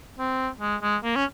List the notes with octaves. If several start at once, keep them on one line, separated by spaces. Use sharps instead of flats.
C4
G#3
G#3
A#3
C#4